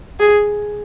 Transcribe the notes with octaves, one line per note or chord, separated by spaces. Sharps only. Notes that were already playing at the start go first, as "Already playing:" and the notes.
G#4